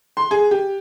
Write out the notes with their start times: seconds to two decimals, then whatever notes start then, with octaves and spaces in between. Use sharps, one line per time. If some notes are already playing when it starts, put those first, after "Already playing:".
0.17 C6
0.31 G#4
0.51 G4